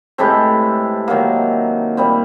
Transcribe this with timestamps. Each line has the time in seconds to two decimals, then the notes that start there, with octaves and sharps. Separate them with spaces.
0.18 A2 E3 G#3 C4 G4 A4
1.08 D#3 F#3 A#3
1.97 A#2 G3 C4